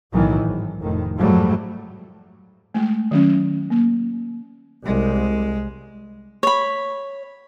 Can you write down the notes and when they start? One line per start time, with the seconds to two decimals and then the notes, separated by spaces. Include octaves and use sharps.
0.13 B1 A2 D#3 E3 F#3
0.43 G#1
0.79 F1 A2 D#3
1.16 F2 G#2 F#3 G3 A3
2.74 G#3 A3
3.11 D#3 F#3 C#4
3.70 A#3
4.86 C2 G#3
6.43 C#5 B5